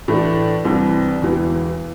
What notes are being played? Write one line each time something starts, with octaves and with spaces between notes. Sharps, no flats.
A2 E3 A3 D4
C2 C3 E3 G3 D4
E1 E2 E3